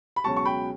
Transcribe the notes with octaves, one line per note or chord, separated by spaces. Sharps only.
B5
C#2 B2 F#3 C#4 A5 C#6
C#6
G5 B5